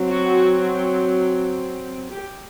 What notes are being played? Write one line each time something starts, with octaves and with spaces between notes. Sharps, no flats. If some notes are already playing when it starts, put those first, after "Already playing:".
Already playing: F#3 C4
F#4
G4